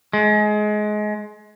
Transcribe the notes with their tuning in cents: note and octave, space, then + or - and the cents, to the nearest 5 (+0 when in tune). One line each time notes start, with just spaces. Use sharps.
G#3 +25